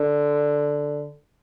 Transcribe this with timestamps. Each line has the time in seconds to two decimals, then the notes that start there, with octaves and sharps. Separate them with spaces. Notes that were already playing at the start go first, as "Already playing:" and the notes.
Already playing: D3